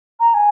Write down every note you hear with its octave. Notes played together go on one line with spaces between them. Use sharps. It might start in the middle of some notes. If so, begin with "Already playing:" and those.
A#5
G#5